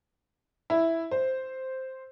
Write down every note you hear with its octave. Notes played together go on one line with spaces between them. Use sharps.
E4
C5